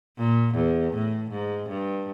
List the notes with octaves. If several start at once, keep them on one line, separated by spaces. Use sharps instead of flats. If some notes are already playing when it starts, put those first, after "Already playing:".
A#2
E2
A2
G#2
G2